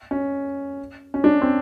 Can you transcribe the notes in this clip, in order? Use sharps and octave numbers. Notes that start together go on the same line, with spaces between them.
C#4
C#4
D4
C4